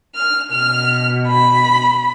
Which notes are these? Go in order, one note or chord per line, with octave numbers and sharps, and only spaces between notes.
F6
B2 F6
B5